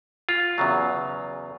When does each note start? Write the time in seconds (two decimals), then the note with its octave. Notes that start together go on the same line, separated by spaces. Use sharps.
0.29 F4
0.58 E2 C#3 F#3